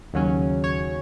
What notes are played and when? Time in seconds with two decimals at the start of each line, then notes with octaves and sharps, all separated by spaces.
0.14 D#2 C#3 F#3 C#4
0.64 C#5